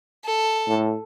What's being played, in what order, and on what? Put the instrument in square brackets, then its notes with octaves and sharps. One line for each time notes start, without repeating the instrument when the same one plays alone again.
[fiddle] A4
[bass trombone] A2